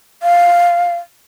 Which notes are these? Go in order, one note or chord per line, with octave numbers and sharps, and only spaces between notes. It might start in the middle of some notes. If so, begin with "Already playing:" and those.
F5